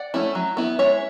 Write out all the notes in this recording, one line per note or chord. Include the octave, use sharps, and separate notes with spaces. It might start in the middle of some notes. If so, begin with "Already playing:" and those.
Already playing: D5 F#5
A3 C#4 E4
F#3
B3 E4
G#3 C#5 E5